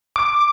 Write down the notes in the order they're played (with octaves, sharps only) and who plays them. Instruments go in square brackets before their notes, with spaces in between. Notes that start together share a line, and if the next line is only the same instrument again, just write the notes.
[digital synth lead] D6